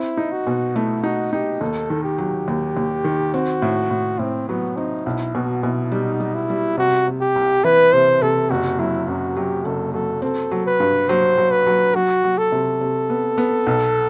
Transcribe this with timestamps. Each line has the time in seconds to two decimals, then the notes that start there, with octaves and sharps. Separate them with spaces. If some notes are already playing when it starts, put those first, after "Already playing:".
Already playing: C4 E4
0.17 D#4
0.32 F#4
0.47 B2
0.75 A3 E4
1.03 D#4 F#4
1.32 D#4 G4
1.61 D#2 A4
1.90 D#3
2.04 G4
2.18 F#3
2.48 D#2
2.77 D#2
3.04 D#3
3.34 C4 F#4
3.62 A2
3.91 A2
4.19 A2 C4
4.48 F#3 B3
4.76 C4 D#4
5.05 B1 E4
5.35 B2 F#4
5.63 B2 E4
5.92 G3 D#4
6.20 G3
6.34 E4
6.50 G3
6.77 C3 F#4
7.07 C3
7.21 G4
7.36 C2
7.64 E3 B4
7.93 C3 C5
8.22 C3 A4
8.50 F#1 F#4
8.79 F#3 E4
9.08 F#2 F#4
9.36 F#3 G4
9.65 F#1 A4
9.93 F#3 A4
10.22 C4 A4
10.51 F#3
10.66 B4
10.80 G2
11.09 F#3 C5
11.38 F#3
11.51 B4
11.67 F#3
11.95 F#3 F#4
12.24 F#3
12.38 A4
12.52 C3
12.81 C3
13.10 B3
13.38 B3
13.67 B1